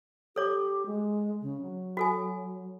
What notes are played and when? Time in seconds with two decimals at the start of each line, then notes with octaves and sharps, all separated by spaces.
0.36 G4 A4 C#5 D6
0.86 G#3
1.42 C#3
1.61 F#3
1.97 F#4 A4 G#5